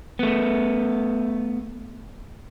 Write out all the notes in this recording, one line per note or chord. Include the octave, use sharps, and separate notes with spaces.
A3 B3